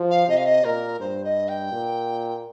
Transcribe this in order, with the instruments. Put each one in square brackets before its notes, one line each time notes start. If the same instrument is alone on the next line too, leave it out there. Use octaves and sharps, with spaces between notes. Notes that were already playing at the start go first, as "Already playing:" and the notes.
Already playing: [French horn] F3
[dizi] F5
[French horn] C3 [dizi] D#5
[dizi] F5
D#5
[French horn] A#2 [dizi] A#4
[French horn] G2 [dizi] C5
[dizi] D#5
G5
[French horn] A#2